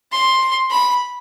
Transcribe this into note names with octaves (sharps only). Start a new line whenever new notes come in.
C6
B5